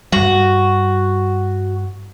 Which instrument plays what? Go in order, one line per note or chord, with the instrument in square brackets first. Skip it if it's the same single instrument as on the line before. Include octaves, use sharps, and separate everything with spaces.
[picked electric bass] G2 G3 [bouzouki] F#4